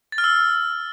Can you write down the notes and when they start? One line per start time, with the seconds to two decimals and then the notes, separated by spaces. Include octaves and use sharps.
0.12 A6
0.18 F6
0.24 E6